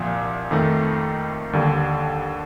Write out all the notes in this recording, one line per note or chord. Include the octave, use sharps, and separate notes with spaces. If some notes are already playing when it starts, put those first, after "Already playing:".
Already playing: C2 A#2 F3
F2 D#3 A3
D#2 D3 G3